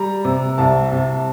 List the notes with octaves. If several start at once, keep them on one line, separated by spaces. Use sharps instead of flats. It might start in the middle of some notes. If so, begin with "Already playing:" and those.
Already playing: G3 A#5
C3
C2 A5
C3